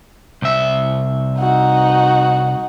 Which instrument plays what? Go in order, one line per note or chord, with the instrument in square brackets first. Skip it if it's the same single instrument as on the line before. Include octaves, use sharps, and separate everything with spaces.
[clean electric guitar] C2 E5
[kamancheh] D#4 F#4